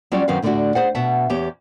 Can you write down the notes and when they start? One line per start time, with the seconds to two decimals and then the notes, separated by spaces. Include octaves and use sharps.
0.12 F#3 G3 C#4 F4 D5
0.28 F#2 D#3 F#3 C4 B4 F5
0.42 A2 D3 A3 B3 D4 F#4
0.75 G#4 C5 F#5
0.95 B2 E5 F#5 A5
1.30 E2 G4 C#5